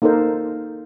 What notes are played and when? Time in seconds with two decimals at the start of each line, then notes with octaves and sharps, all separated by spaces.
0.02 A#3 D#4 A4 A#4 C5